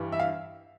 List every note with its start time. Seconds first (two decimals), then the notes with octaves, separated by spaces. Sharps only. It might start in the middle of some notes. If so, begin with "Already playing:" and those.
Already playing: G2 E3 G3
0.12 E5
0.20 F5